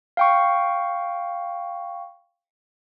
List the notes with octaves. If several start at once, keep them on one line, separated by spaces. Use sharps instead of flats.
F5 G5 C#6